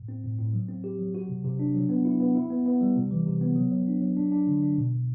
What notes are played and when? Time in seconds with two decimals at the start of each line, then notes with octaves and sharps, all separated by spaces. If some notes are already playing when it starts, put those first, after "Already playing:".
Already playing: A2
0.08 C4
0.24 A2
0.38 A2
0.53 F#3
0.68 C4
0.84 G4
0.99 F#3
1.15 F#4
1.30 C3
1.44 C3
1.59 D4
1.75 F#3
1.89 B3
2.05 E4
2.20 B3
2.35 E4
2.50 B3
2.66 B3
2.81 G3
2.96 C3
3.11 E3
3.26 C3
3.41 B3
3.56 F#3
3.71 F#3
3.87 D4
4.01 F#3
4.17 D4
4.32 D4
4.47 D3
4.62 D4
4.77 B2
4.93 B2